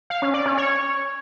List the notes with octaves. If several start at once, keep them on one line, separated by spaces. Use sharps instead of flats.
F5
C#4
D5
C#4
C#5